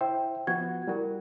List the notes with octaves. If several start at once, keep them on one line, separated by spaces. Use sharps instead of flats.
E4 C5 E5 G5
F3 B3 F#4 F#5 G#6
G3 E4 F#4 A#4